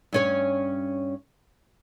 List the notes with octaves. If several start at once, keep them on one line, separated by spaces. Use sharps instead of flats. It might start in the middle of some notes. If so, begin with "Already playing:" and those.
G2 C#4 C#5